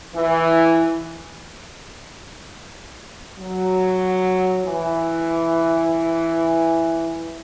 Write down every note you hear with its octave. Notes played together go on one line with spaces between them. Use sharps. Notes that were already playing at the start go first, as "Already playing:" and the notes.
E3
F#3
E3